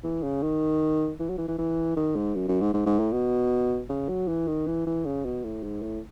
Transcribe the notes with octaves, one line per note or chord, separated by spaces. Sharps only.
E3
C#3
D#3
E3
F#3
E3
E3
E3
D#3
G#2
F#2
F#2
G#2
G#2
G#2
A2
B2
C#3
F#3
E3
D#3
E3
E3
C#3
B2
A2
G#2
A2